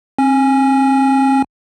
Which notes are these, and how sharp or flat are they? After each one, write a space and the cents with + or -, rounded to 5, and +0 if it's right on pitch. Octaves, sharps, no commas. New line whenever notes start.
C4 +30 G#5 -5